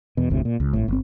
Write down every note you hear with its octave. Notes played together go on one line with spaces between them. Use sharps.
E2 B2
F1 D2 A2 C3
A#2
C#2
G#1 A2
G1 C4